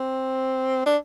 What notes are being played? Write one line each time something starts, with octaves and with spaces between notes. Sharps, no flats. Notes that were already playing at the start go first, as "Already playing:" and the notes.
Already playing: C4
D4